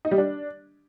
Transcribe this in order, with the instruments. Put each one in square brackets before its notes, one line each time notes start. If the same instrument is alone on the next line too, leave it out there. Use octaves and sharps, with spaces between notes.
[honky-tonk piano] D#4
G3
D4